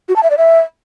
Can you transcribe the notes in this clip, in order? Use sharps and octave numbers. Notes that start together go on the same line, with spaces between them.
F#4
A5
E5
D5
E5